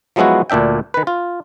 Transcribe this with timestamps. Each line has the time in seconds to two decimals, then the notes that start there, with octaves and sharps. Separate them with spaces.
0.16 F3 F#3 G#3 B3 E4 F#4
0.50 D2 A#2 D4 E5 G5
0.94 D#3 B4
1.07 F4